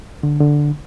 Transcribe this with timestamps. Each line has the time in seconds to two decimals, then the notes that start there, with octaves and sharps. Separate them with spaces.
0.23 D3
0.40 D3